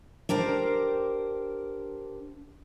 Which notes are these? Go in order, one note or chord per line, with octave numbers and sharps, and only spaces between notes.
D4 G4 A#4 C5